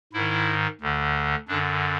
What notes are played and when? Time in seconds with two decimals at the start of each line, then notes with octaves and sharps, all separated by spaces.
0.13 G#2 D#3 E4
0.81 D2 D3
1.48 F#2 D3 D4